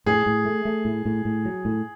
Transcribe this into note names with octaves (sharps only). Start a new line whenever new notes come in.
A2 G#4
A2
A3
A3
A2
A2
A2
F#3
A2